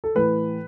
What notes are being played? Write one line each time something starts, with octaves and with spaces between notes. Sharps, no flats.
A4
A2 E3 B4